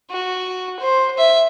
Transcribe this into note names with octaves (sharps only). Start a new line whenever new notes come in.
F#4
C5
E5